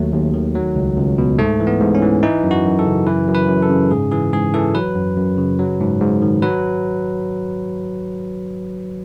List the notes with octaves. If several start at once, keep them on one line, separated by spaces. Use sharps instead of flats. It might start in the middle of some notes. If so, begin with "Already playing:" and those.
Already playing: D#2 F#3 A3
D#2
D#3
F#3
C#2
C#2
B2
G#2 A3
E3
B3
G#2
C#4
E3
E3 D#4
F#2
F#4
F#2
A4
C#3
E3 B4
F#2
B4
F#2
A4
C#3
G#2 G#4
E3 G#4
G#2 G#4
E3 A4
F#3 B4
F#2
F#2
C#3
F#3
G#2
G#2
D#3
F#3 B4